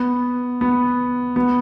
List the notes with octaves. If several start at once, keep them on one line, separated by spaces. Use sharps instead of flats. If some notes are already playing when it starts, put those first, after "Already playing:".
Already playing: B3
B3
B3